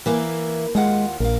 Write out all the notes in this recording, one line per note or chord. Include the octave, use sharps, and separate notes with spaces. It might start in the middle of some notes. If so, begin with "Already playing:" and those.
E3 A#3 E4
D#2 G#3 F4 F#5
A#1 A#4 F5